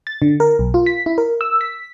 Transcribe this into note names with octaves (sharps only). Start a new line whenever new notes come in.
A6
D3
A#4
B1
F4
B6
E4
A#4
E6
B6